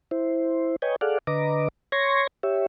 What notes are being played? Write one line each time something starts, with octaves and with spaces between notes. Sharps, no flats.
E4 C5
B4 C#5 D#5 G5 G#5
G#4 A4 D5 F5 F#5
D3 B4 D#5 A#5 D6
C#5 C6 C#6 G#6 A#6
G4 C#5 E5